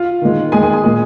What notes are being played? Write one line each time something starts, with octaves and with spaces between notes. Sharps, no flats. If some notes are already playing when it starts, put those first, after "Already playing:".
Already playing: F4 F5
D#3 G#3
D#3 G#3 G#4 G#5
G#4 G#5
G#4 G#5
A#2 G#3